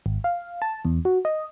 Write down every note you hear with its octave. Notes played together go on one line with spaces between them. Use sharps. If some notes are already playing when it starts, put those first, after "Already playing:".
G#1
F5
A5
E2
F#4
D#5